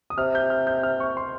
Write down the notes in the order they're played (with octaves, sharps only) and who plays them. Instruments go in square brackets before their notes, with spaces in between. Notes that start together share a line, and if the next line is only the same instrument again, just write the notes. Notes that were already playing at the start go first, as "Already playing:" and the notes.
[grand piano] D#6
[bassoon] C3 [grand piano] F6
[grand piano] G6
F6
G6
F6
C#6
C6